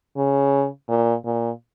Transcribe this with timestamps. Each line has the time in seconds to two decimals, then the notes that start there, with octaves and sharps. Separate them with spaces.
0.17 C#3
0.89 A#2
1.25 A#2